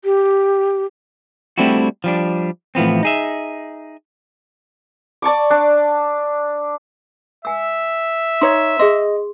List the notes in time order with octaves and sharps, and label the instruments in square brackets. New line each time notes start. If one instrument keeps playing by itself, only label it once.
[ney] G4
[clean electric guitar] G3 A3 C4 D4 E4 F#4
F3 G3 D4
A2 E3 F3 B3 C4
D#4 G#4 E5
[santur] D5 A5 C#6 D6
D4
[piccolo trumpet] E5 [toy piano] G#5 E6
[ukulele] D#4 C#5 [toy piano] C6
[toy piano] G#4 C6 [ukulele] D#5